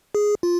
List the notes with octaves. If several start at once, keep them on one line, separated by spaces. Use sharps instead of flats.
G#4
F4